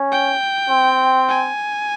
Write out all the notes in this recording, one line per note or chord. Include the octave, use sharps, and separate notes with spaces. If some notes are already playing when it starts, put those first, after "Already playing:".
Already playing: C#4
G5
C4
G#5